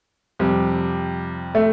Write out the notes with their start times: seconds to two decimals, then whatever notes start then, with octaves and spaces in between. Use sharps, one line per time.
0.39 F2 C3 G3
1.55 A3